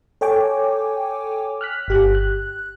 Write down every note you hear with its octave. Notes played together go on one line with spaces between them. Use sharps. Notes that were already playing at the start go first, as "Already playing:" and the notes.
A4 C#5 G5 G#5 D6
F6 F#6 B6
G1 G4 F#6
F#6